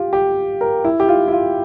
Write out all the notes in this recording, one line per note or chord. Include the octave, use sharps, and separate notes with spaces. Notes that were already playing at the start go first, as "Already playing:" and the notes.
Already playing: F4 G4
G4
A#4
E4
G4
F4
E4
F4